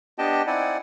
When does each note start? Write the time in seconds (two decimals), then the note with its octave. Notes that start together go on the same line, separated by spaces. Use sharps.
0.18 B3 D4 G4 D#5 G5 A5
0.47 C4 D#4 E4 D5 F#5 G#5